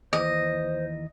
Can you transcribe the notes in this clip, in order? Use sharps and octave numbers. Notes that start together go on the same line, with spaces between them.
D#2 E3 C5 D#5